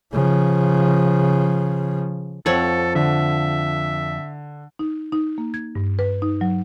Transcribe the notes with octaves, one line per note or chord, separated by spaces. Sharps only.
C#3 F3
F2 C4 A4 C#5 F#5
D3 E5
D#4
D#4
A#3
G#6
G2
B4
D#4
F#3